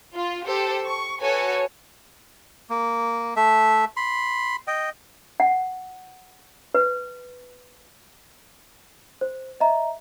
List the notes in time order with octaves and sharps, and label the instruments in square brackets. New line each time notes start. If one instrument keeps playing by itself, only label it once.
[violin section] F4
G4 A4 C5
C#6
F#4 A4 B4 C#5 G#5
[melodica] A#3
A3 E5
B5 C6
D#5 G5
[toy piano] F#5
B4
[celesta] C5
D#5 E5 A#5